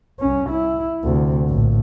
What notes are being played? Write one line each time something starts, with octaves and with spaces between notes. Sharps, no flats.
C2 C#4
E4
D2 C3
A#1 A2